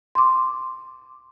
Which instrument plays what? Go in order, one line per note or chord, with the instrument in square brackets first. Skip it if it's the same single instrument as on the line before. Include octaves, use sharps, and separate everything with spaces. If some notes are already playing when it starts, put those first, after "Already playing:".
[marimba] C6 D6